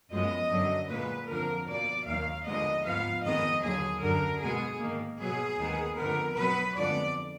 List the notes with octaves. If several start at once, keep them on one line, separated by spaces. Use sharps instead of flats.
F#2 F3 G#3 B3 D#5
F#2 D3 F#3
A#2 G#3 B3 B4
F2 D3 F3 A#4
B2 A#3 D5
D#2 D#3 F#3 A#3 F5
D#2 D3 F3 G#3 B3 D#5
G#2 F3 B3 F5
F2 D#3 G#3 B3 D#5
D#2 D3 F#3 G#4
F#2 D3 F#3 A#4
B2 G#3 B3 G#4
G#2 D#3 A#3
B2 F#3 B3 G#4
D#2 D#3 G#3 B3
F2 D3 G#3 B3 A#4
B2 F#3 B3 B4
F2 D3 G#3 B3 D5